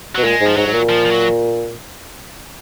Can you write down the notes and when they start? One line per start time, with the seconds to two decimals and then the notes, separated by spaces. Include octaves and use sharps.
0.15 B2 F#3
0.24 A#2 G#3
0.41 G#2
0.46 F3
0.57 G#2 F#3
0.67 G#2
0.73 A#2
0.89 F3
1.05 F3
1.11 F#3